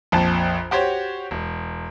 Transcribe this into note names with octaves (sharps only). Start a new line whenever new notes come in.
A#1 F2 A5
F#4 G4 C5 C#5
E1